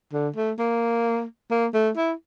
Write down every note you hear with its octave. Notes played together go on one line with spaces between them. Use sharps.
D3
A3
A#3
A#3
A3
E4